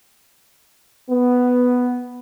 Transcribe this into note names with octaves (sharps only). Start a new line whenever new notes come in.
B3